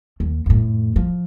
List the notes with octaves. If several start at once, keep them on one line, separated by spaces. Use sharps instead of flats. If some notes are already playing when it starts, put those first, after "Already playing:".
D#2
F2 A2
F3